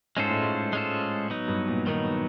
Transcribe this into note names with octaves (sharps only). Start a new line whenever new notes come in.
G#2 G#3 C#4 F4 A4 C5
A2
G#2
G#3 C#4 F4 A4 C5
F#3 B3 D#4
G2
A#2
D#3 F#3 B3 D#4